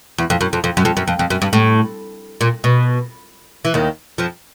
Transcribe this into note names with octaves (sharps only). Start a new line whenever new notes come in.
E2
F2
F#2
F2
F2
F#2
F2
F#2
F2
F2
F#2
G2
A2
A#2
B2
E3
D#2 D#3
F2 F3